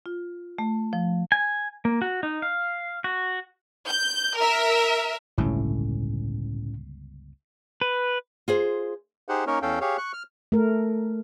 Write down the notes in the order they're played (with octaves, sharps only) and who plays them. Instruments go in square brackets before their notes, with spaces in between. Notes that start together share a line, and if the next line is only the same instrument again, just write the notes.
[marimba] F4
A3
F3
[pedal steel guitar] G#5
A#3
F#4
D#4
F5
F#4
[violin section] G6
A#4 E5
[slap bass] G1 C#2 C3 [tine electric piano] A2 C#4
[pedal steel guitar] B4
[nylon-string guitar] F4 G#4 C5
[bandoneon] D#4 G4 G#4 C5 F#5
A#3 C#4 D#4 A#4 C#5
E2 C#4 A4 F5 G5
G4 G#4 C#5 F5
C#6 F#6
F6
[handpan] A3 A#4